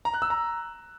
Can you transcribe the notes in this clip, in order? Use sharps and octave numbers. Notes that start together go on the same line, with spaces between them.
A#5
F#6
E6
A#5